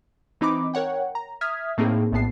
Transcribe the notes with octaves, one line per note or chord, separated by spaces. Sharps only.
E3 C4 D#4 D#5 B5 D6
A#4 C#5 F#5 G5
A#5
E5 D#6 F6 G#6 B6
A2 A#3 C4 D#4 G#4
A#1 A2 B3 A5 C7